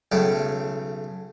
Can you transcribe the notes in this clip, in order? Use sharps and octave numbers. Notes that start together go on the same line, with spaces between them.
B1 C#3 A3 G5